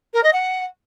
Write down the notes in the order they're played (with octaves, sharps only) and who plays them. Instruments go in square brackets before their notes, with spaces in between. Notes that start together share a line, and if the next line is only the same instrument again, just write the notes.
[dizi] A#4
D#5
F#5